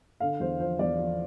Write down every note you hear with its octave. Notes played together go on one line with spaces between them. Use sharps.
D3 F5
E2 C5
F3 C5
E2 D5
F3